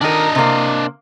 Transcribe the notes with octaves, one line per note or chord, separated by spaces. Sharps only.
D#3 D4 A#4 D#5
C3 A#3